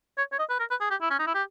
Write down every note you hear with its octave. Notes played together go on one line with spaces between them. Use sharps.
C#5
C#5
D#5
B4
A#4
B4
G#4
G4
E4
C#4
D#4
E4
G4